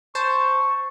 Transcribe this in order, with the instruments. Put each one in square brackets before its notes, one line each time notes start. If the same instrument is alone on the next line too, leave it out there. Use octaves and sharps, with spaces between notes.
[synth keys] C5 A5 [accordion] C#6